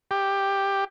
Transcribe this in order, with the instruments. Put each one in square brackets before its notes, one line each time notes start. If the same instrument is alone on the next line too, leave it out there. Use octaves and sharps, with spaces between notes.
[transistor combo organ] G4